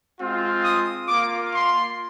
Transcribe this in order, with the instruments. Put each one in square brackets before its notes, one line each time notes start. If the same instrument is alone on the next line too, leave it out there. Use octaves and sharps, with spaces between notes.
[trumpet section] G#3 C4 F4
D#6
A#3 F4 D6
C6